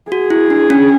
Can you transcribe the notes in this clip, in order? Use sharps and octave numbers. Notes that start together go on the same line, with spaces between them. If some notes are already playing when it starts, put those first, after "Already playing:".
F#4 G#4
E4
D4
C#4